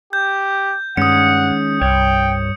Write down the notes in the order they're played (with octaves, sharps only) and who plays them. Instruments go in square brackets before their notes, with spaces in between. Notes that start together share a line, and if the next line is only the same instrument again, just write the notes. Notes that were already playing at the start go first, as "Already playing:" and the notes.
[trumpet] G4 [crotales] G6
[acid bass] G2 [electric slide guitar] D#3 G#3 C#4 [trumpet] F#5 [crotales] D#6 C#7
[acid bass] C2 [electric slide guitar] G2 C#5 [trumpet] G5